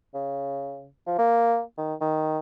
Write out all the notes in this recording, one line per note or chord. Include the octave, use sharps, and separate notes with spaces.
C#3
F3
A#3
D#3
D#3